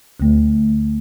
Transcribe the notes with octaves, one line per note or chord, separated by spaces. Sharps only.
D2 D3 A3